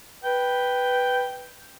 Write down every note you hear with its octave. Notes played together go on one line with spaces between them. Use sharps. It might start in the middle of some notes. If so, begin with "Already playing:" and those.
B4 G5